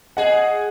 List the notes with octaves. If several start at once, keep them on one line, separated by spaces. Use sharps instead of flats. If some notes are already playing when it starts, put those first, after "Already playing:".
G#4 D#5 F#5